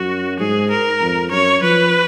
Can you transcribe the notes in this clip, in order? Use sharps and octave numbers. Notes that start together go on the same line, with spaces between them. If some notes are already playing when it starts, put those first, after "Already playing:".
Already playing: F#2 F#4
G#2 G#4
A#4
F2
F#2 C#5
F3 B4